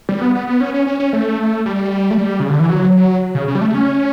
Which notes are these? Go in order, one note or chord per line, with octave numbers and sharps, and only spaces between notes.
G3
B3
B3
B3
C#4
C#4
C#4
C#4
A3
G3
A3
G3
C#3
D3
E3
F#3
C#3
C#3
G3
A3
C#4